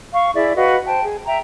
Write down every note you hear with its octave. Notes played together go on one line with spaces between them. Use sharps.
F5 C#6
E4 G#4 D5 E5
F#4 B4 D#5 F5
C5 G5 A5
G#4
E5 G5 A#5